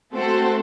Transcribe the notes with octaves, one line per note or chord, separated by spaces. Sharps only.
A3 C4 F#4 A4 C5